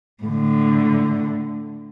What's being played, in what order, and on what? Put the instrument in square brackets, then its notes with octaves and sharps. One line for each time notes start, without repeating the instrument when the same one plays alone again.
[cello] A2 D3